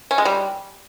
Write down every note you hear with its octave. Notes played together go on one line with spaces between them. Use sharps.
C#4
G#3
G3